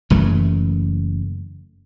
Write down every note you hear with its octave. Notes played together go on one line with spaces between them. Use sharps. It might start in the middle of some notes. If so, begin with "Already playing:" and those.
F#1 F#2 E3 A3